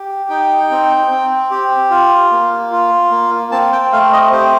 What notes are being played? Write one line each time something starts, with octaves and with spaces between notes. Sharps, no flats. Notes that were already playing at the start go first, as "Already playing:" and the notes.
Already playing: G4
D#4 G5
C4
C4
G4
F4
A#3
F4
A#3
C4 A5
G5
A3 F5
D#5
G4 C5